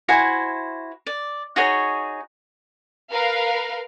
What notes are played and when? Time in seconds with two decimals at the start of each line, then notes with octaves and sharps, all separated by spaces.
0.08 E4 F#4 C5 G#5
1.06 D5
1.56 D#4 F#4 G#4 C#5
3.11 A#4 B4 F5